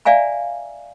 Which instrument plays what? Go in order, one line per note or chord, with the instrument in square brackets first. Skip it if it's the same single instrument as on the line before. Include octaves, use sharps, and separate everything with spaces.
[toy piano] D5 E5 F5 G#5 A#5